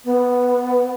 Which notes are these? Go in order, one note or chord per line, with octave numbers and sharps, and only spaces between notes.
B3